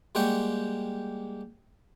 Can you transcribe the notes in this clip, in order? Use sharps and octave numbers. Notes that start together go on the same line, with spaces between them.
G3 G#3 A#3 F#5 G5 C#6